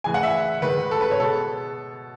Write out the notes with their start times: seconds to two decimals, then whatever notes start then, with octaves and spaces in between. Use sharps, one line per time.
0.04 A2 E3 G#3 G#5
0.14 F#5
0.23 E5
0.62 G#2 D#3 G#3 B4
0.91 A4
1.01 B4
1.11 C#5
1.20 B2 G#3 A4